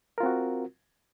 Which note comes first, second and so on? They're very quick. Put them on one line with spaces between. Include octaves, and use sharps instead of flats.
A#4 F4 C4 F#4